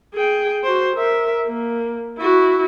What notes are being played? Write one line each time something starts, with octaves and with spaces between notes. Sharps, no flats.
G#4 G5
F#4 C5
A#4 E5
A#3
E4 F#4